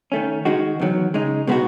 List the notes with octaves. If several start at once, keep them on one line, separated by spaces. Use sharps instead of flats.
D#3 A3 C#4
D#3 G#3 D#4 F#4
E2 D#3 F#3
C#3 G#3 D#4
B2 G#3 B3 D#4 F#4